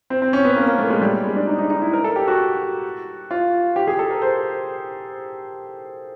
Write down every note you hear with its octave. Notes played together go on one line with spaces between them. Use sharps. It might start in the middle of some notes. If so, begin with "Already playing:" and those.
C4
C4
C#4
B3
A#3
A#3
A3
G#3
G3
G#3
D4
D#4
D#4
D#4
E4
A#4
A4
G4
F#4
F4
G4
G#4
A4
A#4
C5